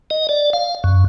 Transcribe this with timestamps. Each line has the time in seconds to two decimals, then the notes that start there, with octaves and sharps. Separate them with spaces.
0.10 D#5
0.29 D5
0.53 F5
0.84 F#2